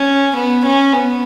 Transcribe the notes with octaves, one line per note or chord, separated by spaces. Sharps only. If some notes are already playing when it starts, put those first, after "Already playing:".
Already playing: C#4
B3
C#4
B3